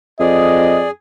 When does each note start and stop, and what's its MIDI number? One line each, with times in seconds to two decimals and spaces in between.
0.19 0.85 41
0.19 0.91 68
0.19 0.88 74
0.19 0.80 75